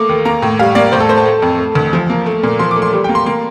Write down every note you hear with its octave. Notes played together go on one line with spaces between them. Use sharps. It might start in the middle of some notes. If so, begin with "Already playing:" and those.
Already playing: A3 A#3 D6
D#2
A#3 A#5
A2
G3 F5
A#3 D5
A2 C5
A4
A3 C5
A5
A3
F2
A3
D2
F3
A#3
A3
A#2
F3 C6
D6
A3
C6
G3
G5
A#3
C6
A#3 C6